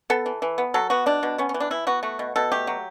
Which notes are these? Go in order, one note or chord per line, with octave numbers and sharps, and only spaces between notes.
B3 A4
E3
E3
B3
F#3 A4
B3 F#4
B2 D4
B2
B3 C#4
C#4
E3
D4
E3 E4
B3 F#4
A3 F#4
B2
B2 A4
A3 G4
F#3